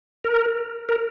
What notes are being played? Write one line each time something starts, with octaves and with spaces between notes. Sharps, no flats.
A#4
A#4